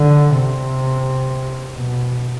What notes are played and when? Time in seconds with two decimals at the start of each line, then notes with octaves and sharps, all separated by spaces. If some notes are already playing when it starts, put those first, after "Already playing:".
Already playing: D3
0.37 C3
1.73 B2